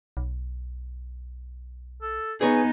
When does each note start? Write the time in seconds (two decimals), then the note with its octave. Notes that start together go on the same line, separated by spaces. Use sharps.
0.17 B1
2.02 A4
2.41 B3 D#4 G#4 B4 C#5 G#5